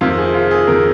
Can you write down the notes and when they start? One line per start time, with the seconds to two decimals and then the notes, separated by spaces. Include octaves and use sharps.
0.01 F2 C3 D#3 F4
0.18 G#4
0.34 F4
0.51 G#4
0.67 F2 C3 D#3 A#4